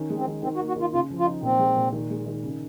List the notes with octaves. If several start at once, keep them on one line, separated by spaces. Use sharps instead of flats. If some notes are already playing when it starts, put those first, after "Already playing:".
Already playing: D#3 C#4
G#3
C4
D#3
D#3 C4
F#4
A#3
F#4
D#3 F4
C#3 F4
F3
F4
D#4
A#2 C4
G#3
A#2
D#3
G#3
D#3
C#3